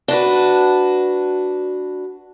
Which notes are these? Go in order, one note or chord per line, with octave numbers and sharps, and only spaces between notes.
D4 F#4 B4